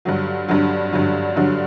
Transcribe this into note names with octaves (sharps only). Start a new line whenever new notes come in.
G2 D3 F#3
G2 D3 F#3
G2 D3 F#3
G2 D3 F#3